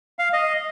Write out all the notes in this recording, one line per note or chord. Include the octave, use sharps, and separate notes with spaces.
F5
D#5